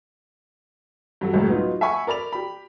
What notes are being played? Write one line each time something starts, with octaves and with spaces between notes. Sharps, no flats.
G2 F#3 A4
C#2 F#2 A2 G3 G#3
F#3 B3 D#4 F4
E5 F#5 G#5 B5 C#6
A#4 D5 B5 F7
G4 B5